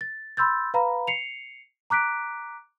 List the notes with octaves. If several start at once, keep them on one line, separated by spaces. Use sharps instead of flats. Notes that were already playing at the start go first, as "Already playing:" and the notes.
A6
B5 C6 E6 G6 A6
B4 F5 A#5 B5
C7 C#7 F7
A#5 D6 F#6 B6 D7